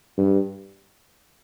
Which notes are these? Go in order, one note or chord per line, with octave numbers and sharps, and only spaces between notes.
G2